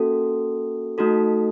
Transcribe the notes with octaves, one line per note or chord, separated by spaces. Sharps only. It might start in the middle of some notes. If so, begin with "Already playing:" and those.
Already playing: A#3 C#4 F#4 A4
A3 D#4 F#4 A4